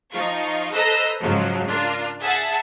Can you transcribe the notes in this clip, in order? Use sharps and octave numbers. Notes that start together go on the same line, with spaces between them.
F3 D#4 F4 C#6
A4 B4 C5 D#5 A#5 E6
G#2 C#3 F3 F#3
D4 F4 A#4
G#4 E5 F#5 A5